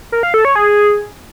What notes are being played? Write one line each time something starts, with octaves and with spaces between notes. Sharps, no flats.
A#4
F5
A4
C#5
G#4